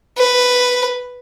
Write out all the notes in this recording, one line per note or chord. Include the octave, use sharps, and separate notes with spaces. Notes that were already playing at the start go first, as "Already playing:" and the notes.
B4